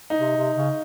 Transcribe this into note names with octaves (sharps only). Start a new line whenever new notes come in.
D#4
C3
C3
C#3